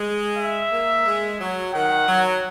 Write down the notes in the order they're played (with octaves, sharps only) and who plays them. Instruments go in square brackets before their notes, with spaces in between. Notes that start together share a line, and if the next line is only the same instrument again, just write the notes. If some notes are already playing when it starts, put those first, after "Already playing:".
Already playing: [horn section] G#3
[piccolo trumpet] E5
[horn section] A#3
G#3
F#3
[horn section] D#3 [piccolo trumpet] F#5
[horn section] F#3